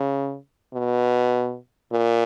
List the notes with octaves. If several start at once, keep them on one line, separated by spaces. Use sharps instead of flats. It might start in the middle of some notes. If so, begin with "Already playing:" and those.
Already playing: C#3
B2
A#2